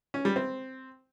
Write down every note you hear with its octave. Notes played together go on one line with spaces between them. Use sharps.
C#4
G3
C4